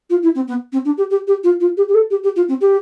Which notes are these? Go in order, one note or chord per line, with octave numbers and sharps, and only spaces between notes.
F4
E4
C4
B3
C4
D4
G4
G4
G4
F4
F4
G4
G4
A4
G4
G4
F4
C4
G4